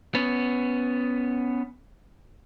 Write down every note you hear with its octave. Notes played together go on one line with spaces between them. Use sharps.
B3 C#4